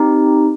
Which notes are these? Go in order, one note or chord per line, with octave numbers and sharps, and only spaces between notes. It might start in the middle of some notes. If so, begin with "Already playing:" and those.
Already playing: C4 D#4 G4